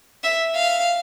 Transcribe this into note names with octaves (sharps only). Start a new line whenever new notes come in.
E5
F5